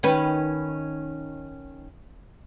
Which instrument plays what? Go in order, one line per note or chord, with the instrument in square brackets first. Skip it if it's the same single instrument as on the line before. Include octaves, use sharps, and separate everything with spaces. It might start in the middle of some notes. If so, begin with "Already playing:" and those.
[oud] D#3 C#4 B4